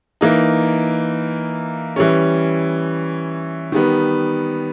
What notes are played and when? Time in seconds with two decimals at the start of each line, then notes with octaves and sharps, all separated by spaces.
0.21 E3 A#3 D#4
1.96 E3 G3 C#4
3.72 D#3 G3 B3